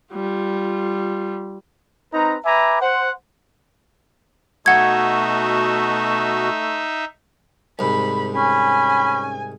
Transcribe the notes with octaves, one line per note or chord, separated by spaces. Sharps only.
G3 F4
C4 D#4 B4 A#5
B4 E5 G#5 A#5 B5 D6
C5 F#5
B2 A3 D#4 F#4 E5 F#5 G#6
C2 G#2 B5
C#4 G#5 B5